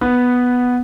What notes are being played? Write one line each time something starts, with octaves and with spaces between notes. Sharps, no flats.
B3